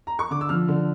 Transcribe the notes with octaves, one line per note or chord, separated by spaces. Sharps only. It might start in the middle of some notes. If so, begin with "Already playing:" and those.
A#5
C#6
D3 D6
E6
F3 F6
D3